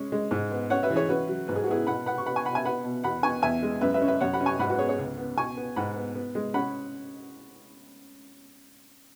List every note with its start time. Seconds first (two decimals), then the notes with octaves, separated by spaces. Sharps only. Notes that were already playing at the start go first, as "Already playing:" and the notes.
Already playing: G#3 C#4
0.12 G#3
0.31 G#2
0.52 B3
0.70 C#4 C#5 F#5
0.83 B4 E5
0.90 E3
0.96 G#4 C#5
1.09 C#4 F#4 B4
1.29 F#3
1.48 G#2 B4
1.56 G#4
1.64 F#4
1.67 B3 E4 G#4
1.87 B2 F#5 B5
2.06 B3 F#5 B5
2.18 C#6
2.26 B3 F#5 B5
2.36 G#5 C#6
2.45 B2 F#5 B5
2.55 E5 G#5
2.65 B3 F#5 B5
2.84 B2
3.04 E2 F#5 B5
3.23 B3 G#5 C#6
3.42 E2 E5 G#5
3.62 G#3
3.81 F#2 B4 E5
3.94 B4 E5
4.02 C#4
4.08 B4 E5
4.21 F#2 C#5 F#5
4.33 F#5 B5
4.40 C#4
4.46 G#5 C#6
4.59 G#2 F#5 B5
4.69 F#4 B4
4.79 B3 G#4 C#5
4.89 G#4 C#5
4.98 C#2
5.18 B3
5.37 B2 G#5 C#6
5.57 B3
5.76 G#2 F#5 B5
5.96 B3
6.15 B3
6.35 G#3
6.54 C#4 F#5 B5